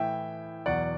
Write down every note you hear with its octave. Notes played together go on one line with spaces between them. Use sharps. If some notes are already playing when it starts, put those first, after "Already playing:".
Already playing: A2 E3 E5 G5
E2 B2 F#3 D5 F#5